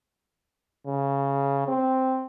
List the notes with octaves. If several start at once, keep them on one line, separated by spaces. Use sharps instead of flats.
C#3
C4